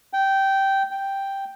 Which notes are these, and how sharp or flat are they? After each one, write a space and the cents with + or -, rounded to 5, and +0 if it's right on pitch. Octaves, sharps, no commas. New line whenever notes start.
G5 -10
G5 +0